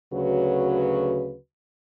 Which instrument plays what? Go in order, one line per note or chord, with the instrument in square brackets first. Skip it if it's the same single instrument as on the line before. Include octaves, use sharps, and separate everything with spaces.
[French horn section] D2 C#3 F#3 F#4 B4